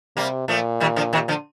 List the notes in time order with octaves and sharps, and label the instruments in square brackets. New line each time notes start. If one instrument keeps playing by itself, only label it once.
[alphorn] C3 [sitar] G3 A#3
[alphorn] A#2 [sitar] F3 A3
[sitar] D#3 G3
D3 F3
C3 D#3
D3 F3